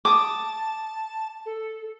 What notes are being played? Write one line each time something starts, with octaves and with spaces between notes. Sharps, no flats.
A5 D6 D#6
A4